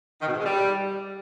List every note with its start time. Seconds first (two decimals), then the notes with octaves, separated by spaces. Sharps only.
0.21 D#3
0.27 B2
0.33 G#2
0.39 G#3
0.45 G3